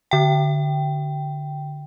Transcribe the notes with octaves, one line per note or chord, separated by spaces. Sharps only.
D3 G5